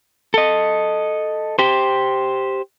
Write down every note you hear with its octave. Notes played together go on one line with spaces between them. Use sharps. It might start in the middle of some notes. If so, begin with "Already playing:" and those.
A4 D#5
G4 C5